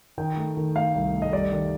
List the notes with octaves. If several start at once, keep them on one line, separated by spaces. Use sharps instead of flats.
D#3 G5
A3
D#3
A3 F5
C2
A3
D#5
G3 D5
D#3